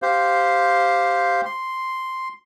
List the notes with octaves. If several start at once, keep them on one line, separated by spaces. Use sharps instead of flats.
G4 C5 F5
C6